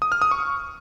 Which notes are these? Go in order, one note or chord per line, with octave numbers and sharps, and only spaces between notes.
D#6
F6
D#6
C#6